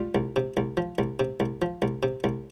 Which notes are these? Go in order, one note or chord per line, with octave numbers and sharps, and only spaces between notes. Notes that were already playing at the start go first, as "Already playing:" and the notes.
Already playing: G3 F4
C2
C3
C2
F3
C2
C3
C2
F3
C2
C3
C2